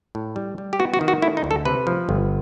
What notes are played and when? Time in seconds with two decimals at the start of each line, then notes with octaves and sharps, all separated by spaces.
0.15 A2
0.36 G3
0.58 G3
0.73 G4
0.79 B3 F#4
0.94 F#4
1.01 D#3
1.08 F#4
1.22 A3 E4
1.37 D#4
1.44 D2
1.51 A4
1.65 C3 B4
1.87 F3
2.09 G1